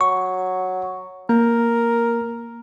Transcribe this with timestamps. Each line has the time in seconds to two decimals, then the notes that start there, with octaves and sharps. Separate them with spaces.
0.01 F#3 C#6
1.29 A#3 A#4